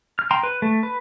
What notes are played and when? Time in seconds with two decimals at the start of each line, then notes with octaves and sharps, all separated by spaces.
0.19 F6
0.31 G5 A#5 C6
0.43 B4
0.62 A3
0.83 B4